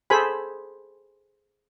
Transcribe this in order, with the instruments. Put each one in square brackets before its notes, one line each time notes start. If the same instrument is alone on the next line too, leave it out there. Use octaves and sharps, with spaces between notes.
[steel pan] G#4 A4 C5 G#5 B5